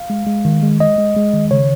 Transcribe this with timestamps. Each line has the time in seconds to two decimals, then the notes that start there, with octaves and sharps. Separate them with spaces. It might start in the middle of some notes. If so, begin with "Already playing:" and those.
Already playing: F5
0.10 G#3
0.27 G#3
0.45 D#3
0.63 G#3
0.80 G#3 D#5
0.98 G#3
1.17 G#3
1.34 D#3
1.51 C#3 C#5